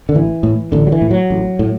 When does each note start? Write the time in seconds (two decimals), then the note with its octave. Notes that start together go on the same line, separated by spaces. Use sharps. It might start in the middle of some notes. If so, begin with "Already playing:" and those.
0.09 D3
0.14 A1 E3
0.43 A2
0.72 A1 D3
0.87 F#3
0.92 E3
1.01 A2
1.11 F#3
1.30 A1
1.59 A2